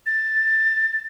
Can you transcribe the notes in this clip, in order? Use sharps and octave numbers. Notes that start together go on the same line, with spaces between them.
A6